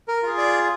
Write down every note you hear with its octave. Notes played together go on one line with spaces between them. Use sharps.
A#4
F4 G#4
D5